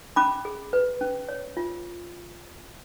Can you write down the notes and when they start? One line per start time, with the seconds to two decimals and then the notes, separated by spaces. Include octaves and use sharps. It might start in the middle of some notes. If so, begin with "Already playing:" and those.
0.16 C#4 B5 D6
0.45 G#4
0.73 B4
1.01 C#4
1.29 C#5
1.57 F4